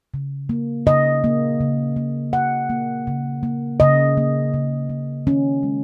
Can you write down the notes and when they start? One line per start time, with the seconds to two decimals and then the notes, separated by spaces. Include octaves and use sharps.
0.14 C#3
0.49 A#3
0.86 C#3 D#5
1.24 A#3
1.60 C#3
1.96 A#3
2.33 C#3 F#5
2.69 A#3
3.07 C#3
3.43 A#3
3.80 C#3 D#5
4.17 A#3
4.54 C#3
4.89 A#3
5.27 D#3 C#4
5.63 G#3